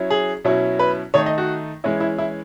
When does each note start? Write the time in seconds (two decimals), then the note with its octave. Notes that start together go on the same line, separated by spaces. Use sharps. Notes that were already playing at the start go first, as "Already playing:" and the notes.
Already playing: F#3 C#4 E4
0.10 G#4
0.45 B2 F#3 C#4 E4
0.79 B4
1.14 D#3 A3 D#4 C#5
1.26 D#5
1.38 F#4
1.84 E3 G#3 C#4 E4
2.00 E4
2.18 E4